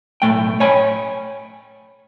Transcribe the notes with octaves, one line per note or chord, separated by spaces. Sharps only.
B1 F#2 A2 A3 G5
C#5 G5 G#5 B5